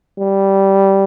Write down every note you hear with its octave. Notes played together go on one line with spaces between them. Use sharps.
G3